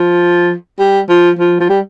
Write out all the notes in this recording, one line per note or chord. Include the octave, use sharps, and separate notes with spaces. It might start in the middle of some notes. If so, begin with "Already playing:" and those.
Already playing: F3
G3
F3
F3
F3
G3